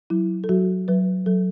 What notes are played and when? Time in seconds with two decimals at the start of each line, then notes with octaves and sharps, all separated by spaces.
0.10 F#3 E4
0.44 A4
0.49 F#3 F#4
0.88 F#3 B4
1.26 F#3 A4